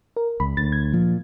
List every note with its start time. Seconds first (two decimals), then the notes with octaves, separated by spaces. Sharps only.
0.16 A#4
0.40 C#2 B5
0.57 D2 A6
0.72 G#6
0.94 A#2 F3